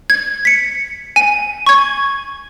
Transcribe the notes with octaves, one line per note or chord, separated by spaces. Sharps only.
G#6
B6 C#7
G#5
C#6 G#6